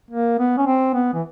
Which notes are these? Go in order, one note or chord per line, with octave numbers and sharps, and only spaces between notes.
A#3
B3
C#4
C4
B3
E3